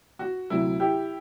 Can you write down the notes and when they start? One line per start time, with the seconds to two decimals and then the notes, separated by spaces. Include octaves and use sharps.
0.19 F#4
0.50 D2 C3 F#3 E4
0.80 E4 G4